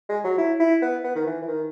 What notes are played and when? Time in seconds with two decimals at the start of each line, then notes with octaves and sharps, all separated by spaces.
0.09 G#3
0.24 F#3
0.38 E4
0.60 E4
0.82 B3
1.04 B3
1.16 D#3
1.26 E3
1.42 E3
1.48 D#3